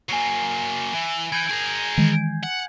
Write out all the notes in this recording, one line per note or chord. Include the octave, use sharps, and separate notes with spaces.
F#3 A#3 G#5 C7
E3
E3 G6 G#6
G#4 A#4
D#3 E3 G#3
F#5